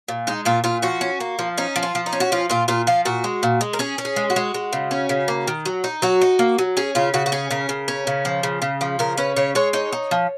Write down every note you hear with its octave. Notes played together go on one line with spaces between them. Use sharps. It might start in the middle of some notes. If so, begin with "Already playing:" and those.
A#2
G#3 D#4
A#2 F4
A#2 F4
F3 F#4
C#4
A#3
F3
C#4 D#4
F3
F4
F3
D#4
C#4
F#4
F3 F4
A#2 F4
A#2 F4
F3 F4
A#2 F#4
G#3
A#2
G#3
A#4
C#4 G#4
C#4
G#4
G#3
F#4
G#3
G#3
C#3
C#4
C#3
A#3
D#3
F#3
D#4
F#3 F#4
D#4
A#3
F#3
C#4 G#4
C#3 F4
C#3 F#4
F#4
C#4 G#4
C#3 A#4
C#3
C#4
C#3
F3
C#3
C#3
F3
C#3 A#4
C#4 B4
C#3 C#5
G#3 C#5
D#4 C#5
D#4
F3